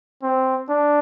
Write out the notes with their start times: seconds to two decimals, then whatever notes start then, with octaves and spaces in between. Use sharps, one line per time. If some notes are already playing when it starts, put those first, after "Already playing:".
0.23 C4
0.69 D4